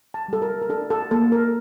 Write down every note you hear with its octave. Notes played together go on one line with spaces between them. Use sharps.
A5
G3 A4
A#4
A#4
D4 A4
A4
A#3 A4
A#4